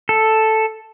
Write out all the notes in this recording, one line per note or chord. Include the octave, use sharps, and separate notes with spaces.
A4